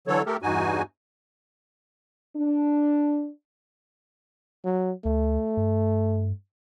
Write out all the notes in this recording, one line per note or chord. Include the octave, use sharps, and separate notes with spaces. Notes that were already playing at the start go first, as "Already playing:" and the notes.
D3 E3 F#3 A4 C#5
A3 G4 A4 A#4
E2 G2 D#4 F#4 G#5
D4
F#3
D2 A3
G2